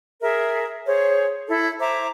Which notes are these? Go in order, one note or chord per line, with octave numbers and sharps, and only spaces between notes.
G#4 A#4 E5
G#4 C5 C#5
E4 A4
C5 E5 A#5 D6